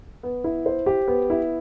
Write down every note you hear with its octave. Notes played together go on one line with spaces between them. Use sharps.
B3
E4
C5
G4
B3
E4